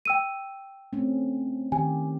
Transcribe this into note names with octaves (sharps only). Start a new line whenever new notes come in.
G5 E6 D#7
A3 C4 C#4
D#3 G4 G#5